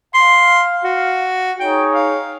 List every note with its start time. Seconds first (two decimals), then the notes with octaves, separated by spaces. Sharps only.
0.14 F5 C6
0.84 F#4
1.60 D#4 G#4 C#5 G5
1.92 F5